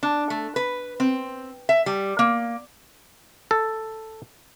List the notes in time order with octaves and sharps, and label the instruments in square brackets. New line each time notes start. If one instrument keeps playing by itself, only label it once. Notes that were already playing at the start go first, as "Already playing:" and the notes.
[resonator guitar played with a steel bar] D4
A3
B4
C4
E5
G3
A#3
[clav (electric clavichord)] A4